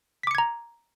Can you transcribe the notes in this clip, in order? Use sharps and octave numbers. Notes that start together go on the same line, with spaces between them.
A#5 D6 G#6 B6 C#7